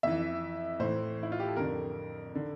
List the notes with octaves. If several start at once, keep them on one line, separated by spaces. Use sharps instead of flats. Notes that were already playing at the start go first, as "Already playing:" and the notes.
F2 E3 E5
A2 E3 C5
E4
F4
G4
A4
F2 D3 A#4
D3